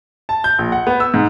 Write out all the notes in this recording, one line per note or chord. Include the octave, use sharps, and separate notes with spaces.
A5
G6
A#1
F#5
B3
E6
G#2